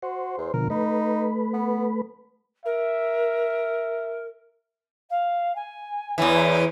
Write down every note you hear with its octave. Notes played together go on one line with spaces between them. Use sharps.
F#4 C5
E2
B2 D3 F3 A#4
A3 D#4 B4
B3
A#4 E5
F5
G#5
E2 E3 C#5